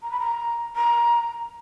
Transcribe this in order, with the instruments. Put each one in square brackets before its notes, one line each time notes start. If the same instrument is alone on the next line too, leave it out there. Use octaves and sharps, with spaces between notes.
[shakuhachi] A#5
B5
A#5
A#5